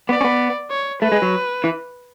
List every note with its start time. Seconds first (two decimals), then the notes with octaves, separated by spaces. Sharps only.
0.09 B3 D5
0.21 C#4
0.24 B3
0.71 C#5
1.02 A3 B4
1.12 G#3
1.22 F#3
1.64 E3